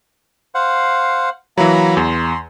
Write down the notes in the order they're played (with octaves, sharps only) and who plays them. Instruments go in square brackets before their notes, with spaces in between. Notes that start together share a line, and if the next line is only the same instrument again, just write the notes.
[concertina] C5 F5 F#5
[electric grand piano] E3 F#3 [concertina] A#3 A#5 B5
[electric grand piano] E2 [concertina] C6